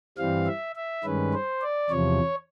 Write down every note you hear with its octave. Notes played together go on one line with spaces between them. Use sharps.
G2 E3 G3 C4 F5
E5
E5
G2 D#3 G#3 C#4 B4
C5
D5
E2 C3 F3 C#5